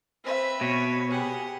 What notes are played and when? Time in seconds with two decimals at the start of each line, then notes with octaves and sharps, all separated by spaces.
0.24 C4 B4 E5
0.61 B2 C#5
1.11 G4 G#4 F#5